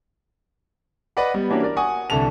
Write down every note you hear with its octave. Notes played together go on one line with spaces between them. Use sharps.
B4 D5 D#5 F#5 B5
G3 B3
E3 A#3 C#4 D4 F#4 G4
A#4 D5
F#5 G#5 C#6 D#6
C2 D3 E3 A4 F7